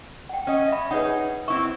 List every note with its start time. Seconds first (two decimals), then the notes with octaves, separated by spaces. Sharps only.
0.29 F#5 G5
0.47 C#4 D#5
0.68 E5 B5
0.91 D#4 G#4 B4 C#5 F#5
1.48 C4 E4 E5 C#6